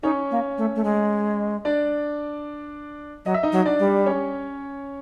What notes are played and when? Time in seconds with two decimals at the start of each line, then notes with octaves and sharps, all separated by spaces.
0.03 C#4 D#4 C#5
0.31 A#3
0.58 A3
0.76 A3
0.84 G#3
1.65 D4 D5
3.25 F#3 D#5
3.34 E5
3.43 D#4 D#5
3.52 F#3
3.66 D4 D5
3.79 G3
4.06 C#4 C#5